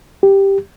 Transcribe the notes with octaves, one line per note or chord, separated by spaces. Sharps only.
G4